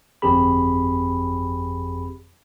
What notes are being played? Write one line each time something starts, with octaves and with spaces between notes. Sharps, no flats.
G1 F2 C4 G4 G#4 B5